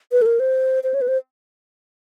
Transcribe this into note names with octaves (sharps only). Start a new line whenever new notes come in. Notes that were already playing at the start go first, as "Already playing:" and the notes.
B4
A4
A#4
C5
C5
C#5
B4
C5